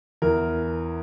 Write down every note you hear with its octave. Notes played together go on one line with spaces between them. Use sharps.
E2 A#4